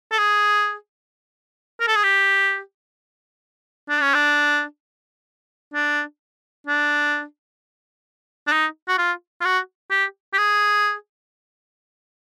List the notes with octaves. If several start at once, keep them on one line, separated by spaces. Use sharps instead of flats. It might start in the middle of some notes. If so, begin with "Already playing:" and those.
A4
G#4
A#4
A4
G#4
G4
D4
C#4
D4
D4
D4
D4
D#4
F#4
F4
F4
F#4
G4
G4
G#4